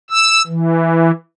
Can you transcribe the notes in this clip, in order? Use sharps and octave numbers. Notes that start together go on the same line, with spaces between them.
E6
E3